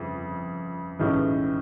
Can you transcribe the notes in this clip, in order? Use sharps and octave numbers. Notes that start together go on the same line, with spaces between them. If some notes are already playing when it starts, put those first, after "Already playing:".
Already playing: G1 F2 C#3
B1 A2 E3 G#3 C#4